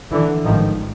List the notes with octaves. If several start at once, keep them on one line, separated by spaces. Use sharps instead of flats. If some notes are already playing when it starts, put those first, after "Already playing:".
D3 E3
A1 G#2 D#3 F3